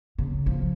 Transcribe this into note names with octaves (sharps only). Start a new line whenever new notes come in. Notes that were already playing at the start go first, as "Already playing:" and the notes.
C#3
F3